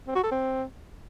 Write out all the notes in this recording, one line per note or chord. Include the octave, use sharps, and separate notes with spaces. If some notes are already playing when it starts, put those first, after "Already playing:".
C4
F#4
A4
C4